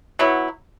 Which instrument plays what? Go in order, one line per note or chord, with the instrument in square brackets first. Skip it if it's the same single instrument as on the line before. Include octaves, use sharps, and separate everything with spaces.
[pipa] F#3 B3 E4